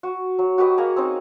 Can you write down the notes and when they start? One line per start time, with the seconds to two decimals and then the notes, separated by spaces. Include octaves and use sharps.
0.03 F#4
0.39 F#3
0.58 F#4 G4 B4 D#5
0.77 A#3 G#4 A#5
0.96 C4 C#4 D#4